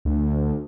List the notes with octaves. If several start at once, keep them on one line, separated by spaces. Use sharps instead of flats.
D2